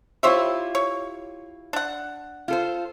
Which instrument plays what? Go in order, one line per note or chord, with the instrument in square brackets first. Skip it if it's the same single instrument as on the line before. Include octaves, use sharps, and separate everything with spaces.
[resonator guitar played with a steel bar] E4 F4 G4 [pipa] C5 C#5 E5
[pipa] C#5
D4 F#5
[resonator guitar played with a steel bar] F4 A4 C5